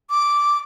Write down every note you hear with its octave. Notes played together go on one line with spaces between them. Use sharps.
D6